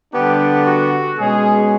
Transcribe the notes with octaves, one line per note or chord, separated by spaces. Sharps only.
D3 G3 B3 D4 G4
F#4
B2 G#3 C#4 G#4